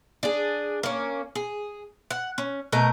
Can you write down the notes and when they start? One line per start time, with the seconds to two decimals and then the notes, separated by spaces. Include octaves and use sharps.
0.23 D4 G#4
0.83 A#3 C#4
1.35 G#4
2.11 F#5
2.38 C#4
2.72 B2 A3 A#4 D#5